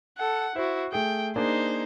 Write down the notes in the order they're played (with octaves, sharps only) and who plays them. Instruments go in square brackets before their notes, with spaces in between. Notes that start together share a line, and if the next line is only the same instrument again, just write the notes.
[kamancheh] A4 F#5
[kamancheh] E4 F#4 [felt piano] C5
[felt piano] A3 G#4 [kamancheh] G5
[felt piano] A#3 D4 G#4 [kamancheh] D#4 C5